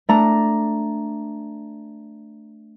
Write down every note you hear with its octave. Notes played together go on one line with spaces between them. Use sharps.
A3 D4 A#5